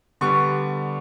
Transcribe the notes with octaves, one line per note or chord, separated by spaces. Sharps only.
D3 G3 B3 C#6